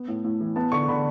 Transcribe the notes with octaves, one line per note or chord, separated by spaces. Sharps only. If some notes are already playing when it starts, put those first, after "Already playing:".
Already playing: B3
A2
A2
E3
B3 A5
D3 C#6
D3 B5